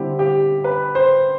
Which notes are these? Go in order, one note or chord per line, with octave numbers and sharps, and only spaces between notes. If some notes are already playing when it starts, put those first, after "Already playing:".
Already playing: D3 G3 C4 E4 G4
G4
B4
C5